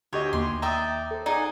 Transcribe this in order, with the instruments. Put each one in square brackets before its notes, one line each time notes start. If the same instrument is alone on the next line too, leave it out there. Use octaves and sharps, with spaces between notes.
[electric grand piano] D2 G4 D#5 [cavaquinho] C#5
[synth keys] D#2 A#3 [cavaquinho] C6
[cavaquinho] D5 E5 G5 [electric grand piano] A#5 D#6
[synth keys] A4 C5
[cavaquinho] D#4 F#5 G#5 [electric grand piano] G#4 D5